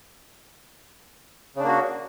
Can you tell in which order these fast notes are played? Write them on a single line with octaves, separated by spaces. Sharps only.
C#3 D4 A#3 F#4